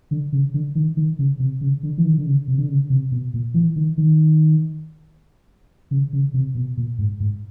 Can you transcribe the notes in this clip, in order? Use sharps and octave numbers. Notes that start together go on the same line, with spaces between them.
D3
C#3
D3
D#3
D#3
C#3
C3
C#3
D3
E3
D#3
D3
C#3
C3
D3
C#3
C3
B2
A#2
E3
D#3
D#3
C#3
C#3
C3
B2
A#2
G#2
G#2